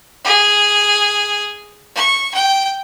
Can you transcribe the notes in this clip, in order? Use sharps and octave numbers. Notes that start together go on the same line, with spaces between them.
G#4
C#6
G5